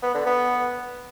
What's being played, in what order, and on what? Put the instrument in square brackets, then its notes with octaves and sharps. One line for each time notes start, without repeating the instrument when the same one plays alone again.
[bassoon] B3
D3
B3